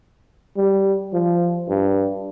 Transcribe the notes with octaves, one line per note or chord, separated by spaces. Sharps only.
G3
F3
G2